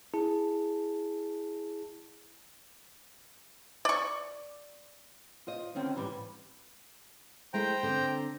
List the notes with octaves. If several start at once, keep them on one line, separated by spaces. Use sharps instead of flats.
E4 G#4 A5
D5 C#6
F4 C5 D#5
D3 D#3 C4 C#4 D#4
G#2 E3 G3
G#3 A3 E4 C5 G5 A#5
D3 C4